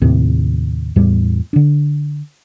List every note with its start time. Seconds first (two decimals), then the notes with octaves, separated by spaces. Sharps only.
0.02 D#2 A2 C3 C4
0.96 E2 A2 G3
1.53 D3 D4